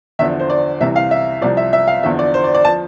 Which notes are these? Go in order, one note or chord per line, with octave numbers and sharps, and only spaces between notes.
E2 D3 F3 E5
C5
D5
C2 C3 E3 E5
F5
E5
C2 C3 F3 D5
E5
E5
F5
E2 D3 F3 E5
D5
C5
D5
D5
F3 A5